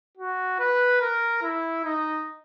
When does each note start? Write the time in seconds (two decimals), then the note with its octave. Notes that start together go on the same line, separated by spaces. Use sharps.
0.17 F#4
0.60 B4
1.01 A#4
1.42 E4
1.84 D#4